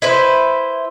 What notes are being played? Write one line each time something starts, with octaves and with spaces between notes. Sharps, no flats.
E4 B4 C5